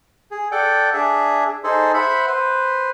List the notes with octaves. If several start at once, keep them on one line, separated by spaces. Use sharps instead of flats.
G#4
A4 D5 F#5 G5
D4 G#4 E5
D#4 G#4 A4 C5
C5 E5 F#5 B5
B4 C5